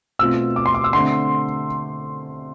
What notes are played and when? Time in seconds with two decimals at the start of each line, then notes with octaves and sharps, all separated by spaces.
0.19 B2 A3 C4 F4 E6
0.56 D6
0.66 C6
0.74 D6
0.84 E6
0.93 D3 A3 C4 C6